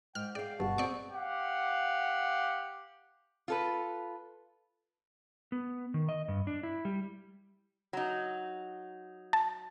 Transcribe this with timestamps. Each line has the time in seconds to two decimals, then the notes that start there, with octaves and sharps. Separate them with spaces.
0.15 G#2 G5 F6
0.35 G#4 D5 E5 F5 G5
0.60 G1 G2 B2 F#4 A5
0.78 C4 G#4 D5 C#6
1.12 G4 F5 F#5
3.48 F4 A4 B4
5.52 B3
5.94 D#3
6.09 D#5
6.28 G2
6.47 D4
6.63 E4
6.85 G3
7.93 F#3 D#4
9.33 A5